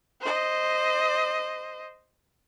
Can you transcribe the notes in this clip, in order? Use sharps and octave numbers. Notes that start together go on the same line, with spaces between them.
C5 D#5